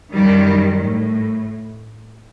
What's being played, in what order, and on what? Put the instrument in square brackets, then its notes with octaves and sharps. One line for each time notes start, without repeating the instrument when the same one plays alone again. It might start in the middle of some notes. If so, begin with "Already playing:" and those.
[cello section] F#2 D#3 G3
A2